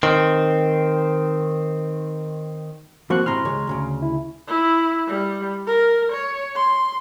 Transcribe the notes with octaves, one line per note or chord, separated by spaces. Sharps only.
D#3 C4
F3 A#3 C4 F#4 C#6 F#6
G#2 C3 E3 A#5 C6 F6
C#2 G#3 C#5
D2 A2 C#3
E4
E4
G3
A#4
C#5
C6